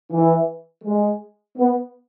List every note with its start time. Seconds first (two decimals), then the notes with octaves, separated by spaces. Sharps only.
0.12 E3
0.84 G#3
1.57 B3